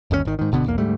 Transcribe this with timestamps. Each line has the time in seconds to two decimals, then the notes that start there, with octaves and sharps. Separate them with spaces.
0.11 G1 D#2 B2 C#4
0.25 G#1 D#3
0.39 G#2 D#3
0.52 G1 B2 D3 B3
0.66 B1 E2 A#3
0.78 D2 G#2 G3 A3